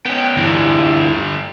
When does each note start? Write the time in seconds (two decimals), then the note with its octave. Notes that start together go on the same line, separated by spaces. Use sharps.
0.06 B3 C#4 G5
0.37 D2 G2 D3 E3